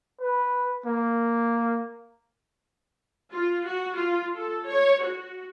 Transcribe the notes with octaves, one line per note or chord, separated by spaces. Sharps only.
B4
A#3
F4
F#4
F4
A4
C#5
F#4